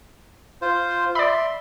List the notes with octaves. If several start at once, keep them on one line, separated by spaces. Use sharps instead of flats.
F4 C5
D5 E5 B5 C6